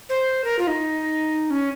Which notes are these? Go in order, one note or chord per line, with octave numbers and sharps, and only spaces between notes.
C5
A#4
F4
D#4
C#4